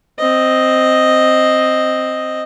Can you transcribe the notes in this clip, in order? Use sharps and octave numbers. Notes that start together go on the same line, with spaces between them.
C4 D#5